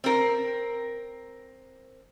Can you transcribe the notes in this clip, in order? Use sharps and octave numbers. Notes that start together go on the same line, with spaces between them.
C4 A#4